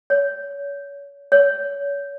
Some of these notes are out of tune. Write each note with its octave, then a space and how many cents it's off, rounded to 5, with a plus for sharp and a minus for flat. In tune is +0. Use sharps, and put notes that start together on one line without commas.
C#5 +30
C#5 +30